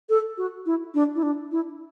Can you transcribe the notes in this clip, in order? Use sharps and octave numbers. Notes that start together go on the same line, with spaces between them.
A4
F#4
E4
D4
E4
D4
E4